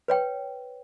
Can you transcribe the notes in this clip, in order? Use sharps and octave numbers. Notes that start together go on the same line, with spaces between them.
B4 C#5 G5